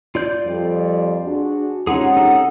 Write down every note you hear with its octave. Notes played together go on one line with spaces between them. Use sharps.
F4 D5 G6
F2 G3
D4 F#4 G#4
C3 G#3 C#4 D#4 F4 G#4 F#5
D#4 G#4 A4